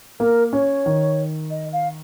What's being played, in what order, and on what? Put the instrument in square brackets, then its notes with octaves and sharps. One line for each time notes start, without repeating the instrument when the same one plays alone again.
[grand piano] A#3 [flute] A#4
[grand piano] C#4 [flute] C#5
[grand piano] D#3
[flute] D#5
F5